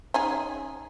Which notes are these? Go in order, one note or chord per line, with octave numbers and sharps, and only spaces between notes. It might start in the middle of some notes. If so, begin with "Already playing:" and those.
C#4 D#4 G#4